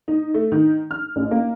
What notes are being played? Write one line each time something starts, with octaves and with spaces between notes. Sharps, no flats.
D#4
A3
D#3
F6
A1
A#3